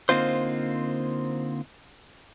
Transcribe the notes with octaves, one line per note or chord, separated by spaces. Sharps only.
D3 A#3 C4 D#4 F4 C5